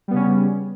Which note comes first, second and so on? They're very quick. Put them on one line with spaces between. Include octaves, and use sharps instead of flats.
G3 B3 C#3 C#4